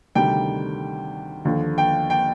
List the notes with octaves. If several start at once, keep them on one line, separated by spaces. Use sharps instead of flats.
D2 C3 D#3 G3 G5
D#2 D3 F3
G5
G5